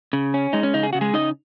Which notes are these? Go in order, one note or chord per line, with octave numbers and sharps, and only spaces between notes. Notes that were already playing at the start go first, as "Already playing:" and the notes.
C#3
C#4
G#3 D#4
C#4
C#3 D#4
G#4
C#3 F#4
G#3 G#4
C#3 D#4 D#5